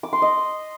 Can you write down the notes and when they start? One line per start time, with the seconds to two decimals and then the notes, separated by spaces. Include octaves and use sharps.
0.03 D6
0.13 C6
0.22 D#5